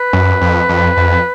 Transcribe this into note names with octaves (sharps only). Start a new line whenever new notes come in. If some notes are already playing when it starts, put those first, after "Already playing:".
Already playing: B4
F#2
F2
F2
F2